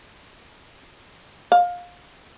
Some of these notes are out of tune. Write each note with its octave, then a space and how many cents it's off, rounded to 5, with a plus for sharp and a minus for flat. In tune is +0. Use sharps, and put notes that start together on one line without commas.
F5 +25